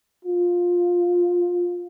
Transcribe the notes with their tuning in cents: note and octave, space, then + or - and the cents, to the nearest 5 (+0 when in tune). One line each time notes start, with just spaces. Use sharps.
F4 +15